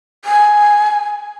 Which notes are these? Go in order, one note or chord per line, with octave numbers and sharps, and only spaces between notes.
G#5